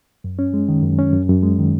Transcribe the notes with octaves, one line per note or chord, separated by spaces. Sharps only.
F#2
C#4
G#3
D#3
F#2
C#4
F#2
F#2
G#3
D#3